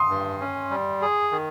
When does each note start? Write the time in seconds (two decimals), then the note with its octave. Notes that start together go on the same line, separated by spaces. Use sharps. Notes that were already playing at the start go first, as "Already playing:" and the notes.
Already playing: C6 D#6
0.09 G2
0.40 C#4
0.70 G3
1.02 G#4
1.32 D#3